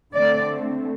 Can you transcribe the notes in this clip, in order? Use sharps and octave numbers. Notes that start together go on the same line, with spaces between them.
D3 A3 C4 D5